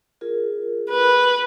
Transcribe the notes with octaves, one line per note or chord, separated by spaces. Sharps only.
F4 G#4 A#4
B4